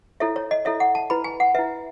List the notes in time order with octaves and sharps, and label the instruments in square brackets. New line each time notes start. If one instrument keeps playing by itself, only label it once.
[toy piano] E4 A4 C#5 E5
C#5
D#5
E4 A4 C#5 E5
F#5
A5
E4 B4 B5
G#5
F#5
B4 E5
E4